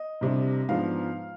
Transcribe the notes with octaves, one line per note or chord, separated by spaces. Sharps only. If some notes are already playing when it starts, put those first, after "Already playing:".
Already playing: D#5
C2 C3 G3 D4
G#2 F3 B3 D4 F5